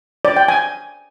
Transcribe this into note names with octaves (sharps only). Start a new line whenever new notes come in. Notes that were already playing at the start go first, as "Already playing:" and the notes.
D5
G5
G#5